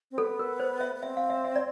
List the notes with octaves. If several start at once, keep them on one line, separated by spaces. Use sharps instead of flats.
C4
B3 A4
A#4
C5
E5
B3
C4 E5
F5
E5
E5
D5